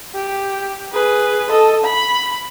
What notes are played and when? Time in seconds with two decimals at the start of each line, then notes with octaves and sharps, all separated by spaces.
0.15 G4
0.92 G#4 B4
1.50 A4 D#5
1.84 B5